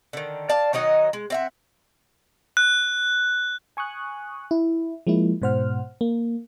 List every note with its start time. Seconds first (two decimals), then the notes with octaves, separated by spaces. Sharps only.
0.13 D3 D#3
0.49 D5 F5 A5
0.73 D#3 F#3 D#4 D#5
1.13 G#3
1.30 C4 E5 F#5
2.57 F#6
3.77 G#5 C#6 D#6 F#6
4.51 E4
5.07 F3 G#3 A#3 E4
5.42 G#2 B2 C5 F#5 F6
6.01 A#3